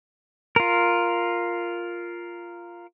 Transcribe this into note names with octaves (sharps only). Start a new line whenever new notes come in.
F4 A#4